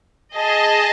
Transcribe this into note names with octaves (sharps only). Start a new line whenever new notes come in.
G#4 D#5 A5